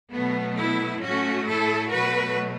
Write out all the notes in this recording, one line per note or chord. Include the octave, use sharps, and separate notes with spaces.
B2 F#3 A3 B3
B3 E4
A2 A3 C#4 F#4
E4 A4
B2 F#3 A3 F#4 B4